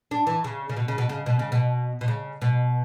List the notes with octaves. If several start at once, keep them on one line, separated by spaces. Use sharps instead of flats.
D4
E3
C#3
C#3
B2
C#3
B2
C#3
B2
C#3
B2
B2
C#3
B2